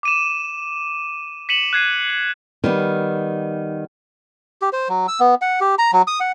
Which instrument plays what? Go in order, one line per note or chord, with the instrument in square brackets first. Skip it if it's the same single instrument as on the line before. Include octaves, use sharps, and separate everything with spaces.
[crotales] D6 D#7 E7
B6 C#7 D#7 E7 F#7
F#6 G#6 C7 D#7
F#7
[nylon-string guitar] D#3 G3 B3
[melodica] G4
C5
F#3
E6
B3
F#5
G4
A#5
F#3
D#6
F#5